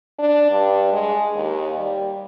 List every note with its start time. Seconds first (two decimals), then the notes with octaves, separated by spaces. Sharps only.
0.19 D4
0.51 G2
0.92 G#3
1.35 D#2
1.77 G3